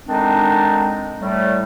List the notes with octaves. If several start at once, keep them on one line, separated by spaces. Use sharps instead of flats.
D3 D#3 G#3 C4 D4 D#4
A2 G3 A3